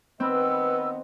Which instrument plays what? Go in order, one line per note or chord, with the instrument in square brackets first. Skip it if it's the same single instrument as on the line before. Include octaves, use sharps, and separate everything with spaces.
[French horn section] D#3 B3 D#5 [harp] C4 [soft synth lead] B4 [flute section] E6